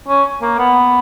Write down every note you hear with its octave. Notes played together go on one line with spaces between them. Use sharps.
C#4
A#3
B3